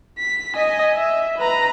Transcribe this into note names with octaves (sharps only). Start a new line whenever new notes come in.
B6
D#5 G#5
E5
B4 A#5